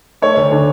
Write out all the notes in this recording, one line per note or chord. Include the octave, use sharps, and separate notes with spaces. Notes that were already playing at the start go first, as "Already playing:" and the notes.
A3 C#5
D2
D3